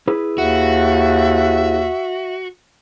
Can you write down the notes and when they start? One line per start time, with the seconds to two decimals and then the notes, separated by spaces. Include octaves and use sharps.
0.08 E4 G#4 B4
0.38 D#2 F#4 E5